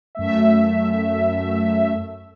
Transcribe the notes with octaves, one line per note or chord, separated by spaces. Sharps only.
F#2 A3 E5